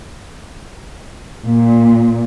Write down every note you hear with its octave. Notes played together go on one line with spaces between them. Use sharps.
A#2